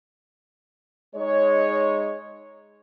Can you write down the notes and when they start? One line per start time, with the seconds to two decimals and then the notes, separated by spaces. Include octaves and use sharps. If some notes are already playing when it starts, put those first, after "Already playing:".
1.15 G#3 D#4 C#5